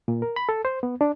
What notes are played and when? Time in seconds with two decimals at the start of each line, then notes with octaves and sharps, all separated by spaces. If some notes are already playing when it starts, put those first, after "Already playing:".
0.08 A#2
0.22 A#4
0.36 B5
0.49 A4
0.65 C5
0.83 B3
1.01 D4